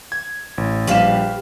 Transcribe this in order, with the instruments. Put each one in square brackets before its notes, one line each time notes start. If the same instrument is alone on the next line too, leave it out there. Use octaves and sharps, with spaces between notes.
[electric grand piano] G#6
A1
[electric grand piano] A#1 G3 E7 [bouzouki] G4 B4 F5